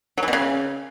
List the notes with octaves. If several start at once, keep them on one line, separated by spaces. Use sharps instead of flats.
F#3
E3
B2
C#3